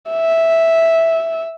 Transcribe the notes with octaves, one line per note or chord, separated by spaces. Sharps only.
E5